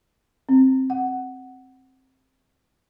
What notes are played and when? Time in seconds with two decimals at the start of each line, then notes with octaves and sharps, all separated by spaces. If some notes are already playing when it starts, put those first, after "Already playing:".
0.49 C4
0.90 F#5